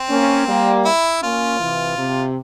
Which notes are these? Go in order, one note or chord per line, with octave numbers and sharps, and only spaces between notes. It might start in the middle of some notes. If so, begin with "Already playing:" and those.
Already playing: C4
A#3 C#4
G3 A#3
E4
A#3 C#4 F4
C3 E3
C3